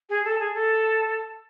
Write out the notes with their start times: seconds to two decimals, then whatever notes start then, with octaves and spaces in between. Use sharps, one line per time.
0.09 G#4
0.24 A4
0.39 G#4
0.54 A4